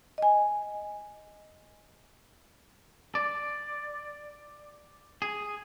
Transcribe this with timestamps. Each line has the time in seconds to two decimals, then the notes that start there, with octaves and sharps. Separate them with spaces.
0.18 D#5 G#5
3.15 D5
5.22 G#4